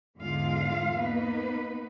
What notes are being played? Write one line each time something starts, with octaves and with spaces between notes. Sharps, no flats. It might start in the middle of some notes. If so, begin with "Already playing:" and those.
E2 G#2 D3 G#3 F4 F5
A#3 B3 D#4 B4